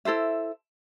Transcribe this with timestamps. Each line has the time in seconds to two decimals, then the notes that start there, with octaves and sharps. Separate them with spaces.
0.05 E4 A4 C5 E5